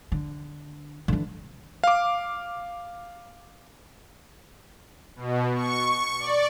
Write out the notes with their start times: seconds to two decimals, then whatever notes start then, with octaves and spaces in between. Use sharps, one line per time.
0.12 D3
1.08 D3 E3
1.84 F5 D6
5.16 B2
5.55 C#6
6.19 D5